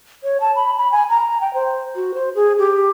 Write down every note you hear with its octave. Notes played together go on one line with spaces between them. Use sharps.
C#5
A5
B5
B5
G#5
A#5
G5
C5
F#4
C5
G#4
G4